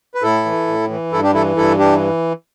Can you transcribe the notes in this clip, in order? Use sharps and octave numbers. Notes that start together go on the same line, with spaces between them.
B4
A2 E4 A4
E3
A2
E3
G2 E4 A4
D4 G4
E3 E4 A4
G2 E4 A4
E3 D4 G4